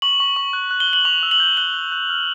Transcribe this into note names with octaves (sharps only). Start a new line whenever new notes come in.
C#6 F#7
C#6
C#6
F#6
F#6
G7
F#6
F#7
C#6 F7
E6
F#7
G6
F#6 G7
F#6
F#6
F6